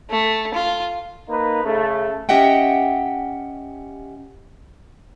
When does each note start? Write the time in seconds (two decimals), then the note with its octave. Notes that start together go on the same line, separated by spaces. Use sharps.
0.11 A3
0.54 F4
1.29 A#3 D#4 B4
1.64 C#3 A3
2.29 C#4 G4 D#5 E5 F#5 G5